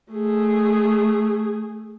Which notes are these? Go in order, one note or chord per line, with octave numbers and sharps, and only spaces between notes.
A3 G#4